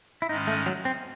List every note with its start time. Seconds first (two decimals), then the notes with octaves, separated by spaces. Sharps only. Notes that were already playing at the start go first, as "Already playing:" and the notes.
0.22 E4
0.28 G#2 D#3 G#3 C#4 D#4
0.47 A3
0.66 F#3
0.85 C4